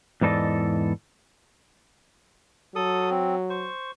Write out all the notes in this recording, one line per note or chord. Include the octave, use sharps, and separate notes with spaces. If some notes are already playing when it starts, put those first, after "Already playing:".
E2 G#2 E3 A4 D5 D#5
F#3 A4 D#6
C4
C5 C#6